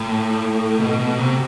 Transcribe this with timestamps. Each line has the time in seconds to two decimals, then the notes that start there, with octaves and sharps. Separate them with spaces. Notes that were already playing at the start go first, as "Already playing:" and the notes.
Already playing: A2
0.80 B2
0.99 B2
1.18 C3